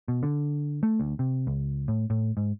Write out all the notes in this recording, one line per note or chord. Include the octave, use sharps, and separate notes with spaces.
B2
D3
A3
D2
C3
C#2
A2
A2
G#2